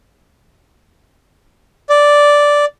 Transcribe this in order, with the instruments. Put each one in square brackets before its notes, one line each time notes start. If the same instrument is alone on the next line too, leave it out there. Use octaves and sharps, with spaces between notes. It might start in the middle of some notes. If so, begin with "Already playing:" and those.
[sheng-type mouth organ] D5